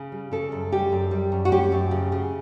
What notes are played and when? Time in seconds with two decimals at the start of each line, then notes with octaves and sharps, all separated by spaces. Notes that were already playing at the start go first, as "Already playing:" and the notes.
Already playing: C#3
0.12 G3
0.31 C#3 A4
0.52 F#2
0.72 G3 G4
0.92 F#2
1.11 G3
1.32 F#2
1.45 F#4
1.52 C#4 G4
1.72 F#2
1.91 C#3
2.12 C#3